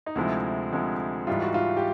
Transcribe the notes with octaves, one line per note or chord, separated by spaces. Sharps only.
D#4
D2 C3 F3 G#3 E4
D2 C3 F3 G#3
G#2 E3 G3 F4
F#4
F4
G4